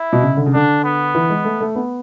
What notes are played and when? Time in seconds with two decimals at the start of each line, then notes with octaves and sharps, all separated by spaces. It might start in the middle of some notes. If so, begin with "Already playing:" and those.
Already playing: E4
0.13 B2
0.22 C#3
0.37 D3
0.46 C#3
0.53 D3 D4
0.84 B3
1.15 E3
1.29 G#3
1.44 A3
1.61 A3
1.75 B3